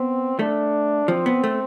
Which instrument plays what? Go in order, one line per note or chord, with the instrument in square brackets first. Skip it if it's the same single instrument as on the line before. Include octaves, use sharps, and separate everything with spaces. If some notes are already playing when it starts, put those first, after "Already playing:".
Already playing: [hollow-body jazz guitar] B3 [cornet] C4
[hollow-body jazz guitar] A3 [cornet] D4
[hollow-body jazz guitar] F3 [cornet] C4
[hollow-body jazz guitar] B3
A3